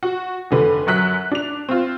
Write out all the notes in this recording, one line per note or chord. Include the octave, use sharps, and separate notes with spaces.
F#4
F1 D3 B4
F#2 F#3 F#6 B6
D4 F7
C4 F4